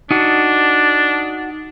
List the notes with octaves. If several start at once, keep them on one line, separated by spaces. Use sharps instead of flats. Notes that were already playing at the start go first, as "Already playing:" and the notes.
D4 D#4 F#4